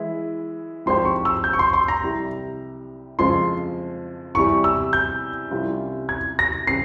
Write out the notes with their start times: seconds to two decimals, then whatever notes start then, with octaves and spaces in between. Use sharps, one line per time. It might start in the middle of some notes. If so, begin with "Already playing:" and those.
Already playing: E3 G#3 E4
0.86 G#2 F3 C4 G4 C5 C6
1.05 C#6
1.25 E6
1.44 G6
1.53 C#6
1.59 C6
1.73 C6
1.88 A#5
2.02 C2 C3 G3
3.19 F2 C#3 F3 G#3 C6
4.35 E2 C3 G3 C#6
4.64 E6
4.93 G6
5.51 C2 C3 G3 C#4 F4
6.09 G#6
6.39 A#6
6.67 C#3 G3 C4 C7